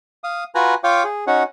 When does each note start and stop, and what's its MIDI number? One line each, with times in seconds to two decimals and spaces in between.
0.24 0.44 77
0.24 0.44 87
0.55 0.75 65
0.55 0.75 66
0.55 0.75 71
0.55 0.75 80
0.55 0.75 82
0.55 0.75 90
0.84 1.03 65
0.84 1.03 73
0.84 1.03 77
0.84 1.03 79
0.84 1.03 86
1.04 1.25 68
1.27 1.43 61
1.27 1.43 63
1.27 1.43 66
1.27 1.43 73
1.27 1.43 78